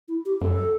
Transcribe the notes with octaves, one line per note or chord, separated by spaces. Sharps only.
E4
G4
F#2 A4